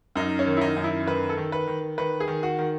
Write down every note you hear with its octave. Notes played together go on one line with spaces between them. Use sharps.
F#2 D#4
C#4
D#3
E4
D#4
F#2
E4
D#3 B4
A4
D#3
B4
D#3
D#3 B4
G#4
D#3
F#4
D#3